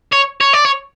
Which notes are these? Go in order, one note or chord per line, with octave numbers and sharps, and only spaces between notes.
C#5
C#5
D5
C#5